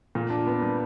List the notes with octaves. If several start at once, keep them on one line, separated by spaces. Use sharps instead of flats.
A#2
D4
B3
G3